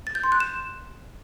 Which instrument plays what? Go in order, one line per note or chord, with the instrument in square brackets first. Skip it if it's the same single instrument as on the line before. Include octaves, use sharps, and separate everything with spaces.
[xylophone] A6
G6
C6
F#6
E7